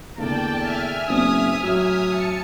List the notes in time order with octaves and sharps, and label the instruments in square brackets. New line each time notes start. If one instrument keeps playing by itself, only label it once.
[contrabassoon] E2 [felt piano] D3 A3 A#3 [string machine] D5 G5 [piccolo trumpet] A5
[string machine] E5 G#5 F6
[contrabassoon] F#1 [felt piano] B3 C4 D4 [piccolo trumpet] D#6
[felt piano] A1 [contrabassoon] F#3 [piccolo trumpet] D#6
[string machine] A5 C#7